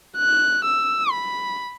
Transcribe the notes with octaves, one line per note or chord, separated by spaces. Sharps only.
F#6
E6
B5